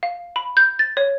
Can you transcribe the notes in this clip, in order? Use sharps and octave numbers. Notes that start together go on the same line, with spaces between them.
F5
B5
G6
A6
C#5